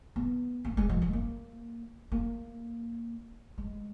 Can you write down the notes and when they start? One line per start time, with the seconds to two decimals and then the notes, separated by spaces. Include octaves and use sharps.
0.16 B3
0.65 A#3
0.77 G#3
0.89 F3
1.02 G#3
1.13 A#3
2.12 A#3
3.58 G#3